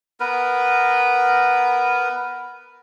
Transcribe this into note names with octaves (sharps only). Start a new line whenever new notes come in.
B3 A#4 B4